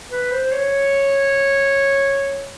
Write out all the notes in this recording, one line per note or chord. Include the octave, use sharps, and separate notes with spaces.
B4
C5
C#5